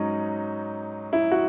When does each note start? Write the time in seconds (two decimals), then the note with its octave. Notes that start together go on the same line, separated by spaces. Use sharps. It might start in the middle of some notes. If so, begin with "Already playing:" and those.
Already playing: G#2 F#3 C#4 D#4
1.13 E4
1.32 F#4